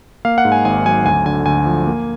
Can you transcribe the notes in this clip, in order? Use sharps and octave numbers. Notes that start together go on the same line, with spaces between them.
A#3 F5
F#5
G#2
G#5
G#1 G#5
F#3 G#5
D2 G#5
D3 G#5
D2 G#5
F3
A#3